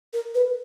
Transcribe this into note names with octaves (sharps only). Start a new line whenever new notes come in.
A#4
B4